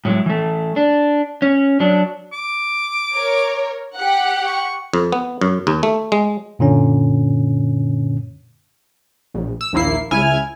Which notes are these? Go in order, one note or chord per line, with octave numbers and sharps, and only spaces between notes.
A2 F#3 G#3 E4
E3 A3
D4
C#4
F#3 D4
D6
A#4 C#5
G4 F#5
C#6
F2
B3
F#2
D#2
A3
G#3
F#2 A#2 D3 C#4
A#1
E6
A#1 D#2 A#3 E4 C7
C#2 E4 G#5 F6